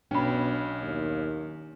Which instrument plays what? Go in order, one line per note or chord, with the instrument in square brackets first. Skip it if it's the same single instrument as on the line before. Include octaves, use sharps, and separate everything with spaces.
[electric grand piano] B1 C#4 [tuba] B2 [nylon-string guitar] D4 [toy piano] G5 B5
[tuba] D#2